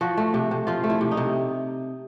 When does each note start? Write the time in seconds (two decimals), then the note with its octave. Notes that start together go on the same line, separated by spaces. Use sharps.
0.01 F3 F#4
0.17 A3
0.34 C3
0.51 C3
0.67 F3 F4
0.84 A3
0.90 E4
1.01 C3
1.11 D#4
1.17 C3